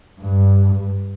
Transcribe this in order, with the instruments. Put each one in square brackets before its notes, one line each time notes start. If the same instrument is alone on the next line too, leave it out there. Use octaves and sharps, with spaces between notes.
[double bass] G2